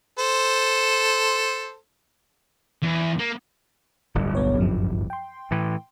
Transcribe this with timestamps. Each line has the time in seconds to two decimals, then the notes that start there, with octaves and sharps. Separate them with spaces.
0.19 A4 C5
2.82 E2
3.19 A#3
4.15 D1 G1 G3
4.35 B1 B3 C#5
4.58 F#2 F3
5.10 G5 C6
5.51 A2 E3